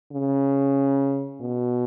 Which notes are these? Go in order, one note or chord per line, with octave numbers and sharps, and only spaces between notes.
C#3
B2